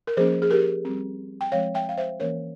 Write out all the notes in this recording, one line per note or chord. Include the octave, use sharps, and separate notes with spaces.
A#4
F3 A#3 C#4 G#4 C5
G#4
G4 A#4
G3 C4
G5
F3 G#3 C4 C#5 F5
E5 G5
F5
C5 E5
E3 A#3 C#4 A#4 C#5